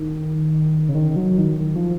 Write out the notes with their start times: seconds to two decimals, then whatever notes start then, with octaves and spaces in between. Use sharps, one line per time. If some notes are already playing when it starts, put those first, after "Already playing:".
Already playing: D#3
0.89 C#3
0.95 D#3
1.16 F#3
1.38 D#3
1.60 D#3
1.76 F3